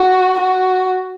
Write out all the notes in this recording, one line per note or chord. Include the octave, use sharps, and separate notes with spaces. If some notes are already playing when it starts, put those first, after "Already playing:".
Already playing: F#4
F#4